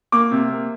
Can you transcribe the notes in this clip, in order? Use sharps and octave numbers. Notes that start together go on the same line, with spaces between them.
A#3 D6
C3
A#3